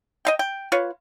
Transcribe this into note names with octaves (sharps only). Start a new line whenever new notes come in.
D#5 F5 G5
G5
F4 B4 C#5